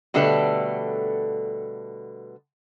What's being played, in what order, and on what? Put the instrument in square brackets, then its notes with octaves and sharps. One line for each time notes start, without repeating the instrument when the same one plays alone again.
[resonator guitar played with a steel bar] B2 D3 G3 A3 A4 B4